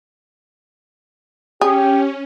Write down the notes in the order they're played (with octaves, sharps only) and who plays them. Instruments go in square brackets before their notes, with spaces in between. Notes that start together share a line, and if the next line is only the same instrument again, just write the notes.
[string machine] C#4 [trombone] G4 [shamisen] G#4 [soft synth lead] G5